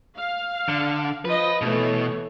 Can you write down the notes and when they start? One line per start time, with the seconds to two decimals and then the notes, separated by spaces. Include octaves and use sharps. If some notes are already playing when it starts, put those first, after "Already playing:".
0.18 F5
0.69 D3
1.25 F3 B4 D#5
1.61 B2 E3 A3 C#5